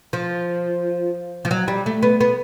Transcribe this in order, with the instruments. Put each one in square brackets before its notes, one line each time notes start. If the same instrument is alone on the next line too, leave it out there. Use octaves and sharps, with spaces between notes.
[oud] F3
F3
F#3
G3
A3
B3
B3